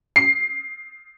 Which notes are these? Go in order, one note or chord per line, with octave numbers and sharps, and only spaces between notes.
C7